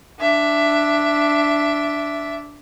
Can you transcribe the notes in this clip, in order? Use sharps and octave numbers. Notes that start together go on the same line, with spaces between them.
D4 E5